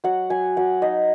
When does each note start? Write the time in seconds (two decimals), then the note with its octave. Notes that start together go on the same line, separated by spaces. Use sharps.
0.04 F#3 F#5
0.30 F#3 G#5
0.57 F#3 F#5
0.82 D#4 D#5